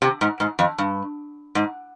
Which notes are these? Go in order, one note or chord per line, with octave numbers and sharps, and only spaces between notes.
C3
G#2
G#2
F2
G2
G#2